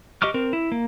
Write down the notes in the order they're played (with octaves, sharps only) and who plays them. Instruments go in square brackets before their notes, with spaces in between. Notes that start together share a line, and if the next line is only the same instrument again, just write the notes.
[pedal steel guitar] G4 D#5 C#6 D6 F6
C4 A#4
E4
A#3